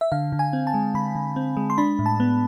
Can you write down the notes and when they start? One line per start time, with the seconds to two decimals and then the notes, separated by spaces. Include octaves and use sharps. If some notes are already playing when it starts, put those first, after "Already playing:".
0.01 E5
0.12 D3 F5
0.32 D3
0.39 G#5
0.53 C4
0.67 A5
0.74 G#3
0.94 D3 B5
1.15 D3
1.36 C4
1.57 G#3
1.70 C6
1.78 D4 B5
1.99 A2
2.06 A5
2.20 B3